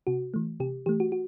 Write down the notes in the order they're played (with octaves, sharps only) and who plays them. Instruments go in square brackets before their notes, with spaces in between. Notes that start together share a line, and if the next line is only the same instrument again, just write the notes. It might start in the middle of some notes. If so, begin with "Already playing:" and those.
[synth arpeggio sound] C3 F#4
E3 A3
C3 G4
E3 A3 G4
F#4
F#4